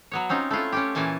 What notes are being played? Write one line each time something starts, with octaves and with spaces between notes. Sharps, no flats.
F#3 B3 C#5
C4 C#4 D#4 F4
A3 E4 F4 A4
C#4 F4 G4
A#2 E3 C#4 G#5 A5